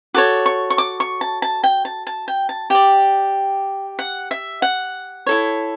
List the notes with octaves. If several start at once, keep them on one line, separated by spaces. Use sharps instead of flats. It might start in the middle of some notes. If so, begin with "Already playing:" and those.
F#4 A4 C#5 D6
C#6
C#6
D6
C#6
A5
A5
G5
A5
A5
G5
A5
G4 D5 G5
F#5
E5
F#5
E4 A4 C#5